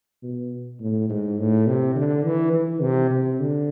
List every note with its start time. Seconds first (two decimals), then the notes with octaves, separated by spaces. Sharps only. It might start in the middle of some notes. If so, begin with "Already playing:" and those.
0.23 B2
0.80 A2
1.09 G#2
1.39 A2
1.67 C3
1.96 D3
2.25 E3
2.53 E3
2.82 C3
3.11 C3
3.40 D3